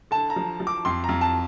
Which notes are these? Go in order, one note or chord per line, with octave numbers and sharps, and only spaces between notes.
D3 A5
A#5
F3
F3
D6
F2 C6
F2 A#5
A5